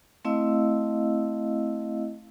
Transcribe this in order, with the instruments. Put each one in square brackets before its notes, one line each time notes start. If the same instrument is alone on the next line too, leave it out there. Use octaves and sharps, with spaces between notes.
[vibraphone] A3 C4 E4 D#5 F5 E6